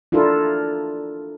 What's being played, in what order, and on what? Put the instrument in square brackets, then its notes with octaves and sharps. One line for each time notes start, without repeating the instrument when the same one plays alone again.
[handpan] D4 E4 F4 A4 A#4